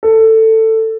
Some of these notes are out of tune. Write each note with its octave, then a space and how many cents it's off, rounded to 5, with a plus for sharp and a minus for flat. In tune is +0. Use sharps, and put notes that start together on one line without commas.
A4 +15